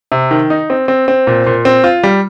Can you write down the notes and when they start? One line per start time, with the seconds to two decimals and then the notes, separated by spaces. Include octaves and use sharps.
0.12 C3
0.31 D#3
0.50 D#4
0.70 C4
0.88 C4
1.08 C4
1.27 A#2
1.47 A#2
1.65 C4
1.84 F4
2.03 G3